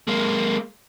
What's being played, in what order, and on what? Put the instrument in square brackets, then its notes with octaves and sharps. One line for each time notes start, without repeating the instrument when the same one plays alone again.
[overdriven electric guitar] G#3 A#3